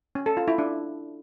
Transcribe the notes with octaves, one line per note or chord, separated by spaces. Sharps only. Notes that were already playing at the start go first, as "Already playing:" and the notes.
C#4
A4
F4
E4
D4